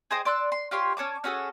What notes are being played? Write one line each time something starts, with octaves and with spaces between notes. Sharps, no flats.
G#4 C5 D#5 G5
D5 C6 E6 F#6
C6
F4 G4 C#5 C6
C#4 C#5 A5 D6
C#4 F#4 G#4 A4